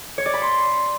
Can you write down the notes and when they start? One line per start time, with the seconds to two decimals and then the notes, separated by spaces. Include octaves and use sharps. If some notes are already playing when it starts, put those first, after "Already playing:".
0.18 C#5
0.26 D5
0.33 B5
0.41 C6